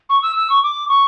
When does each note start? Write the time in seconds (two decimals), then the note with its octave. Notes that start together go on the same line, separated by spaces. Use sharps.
0.10 C#6
0.23 E6
0.36 E6
0.50 C#6
0.64 D6
0.89 C#6